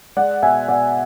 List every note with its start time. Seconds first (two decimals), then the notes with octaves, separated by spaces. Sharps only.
0.17 G#3 D5 F#5
0.43 B2 E5 G#5
0.68 B2 D5 F#5